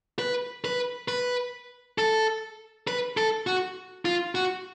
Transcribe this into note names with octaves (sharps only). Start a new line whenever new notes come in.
B4
B4
B4
A4
B4
A4
F#4
F4
F#4